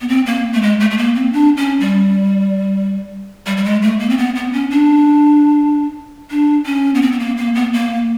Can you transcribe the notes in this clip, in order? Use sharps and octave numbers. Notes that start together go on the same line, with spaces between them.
B3
C4
A#3
A3
G#3
A3
A3
A#3
C4
D4
C#4
G3
G3
G3
G#3
A3
A#3
C4
B3
B3
C#4
D4
D4
C#4
B3
C4
B3
A#3
A#3
B3
A#3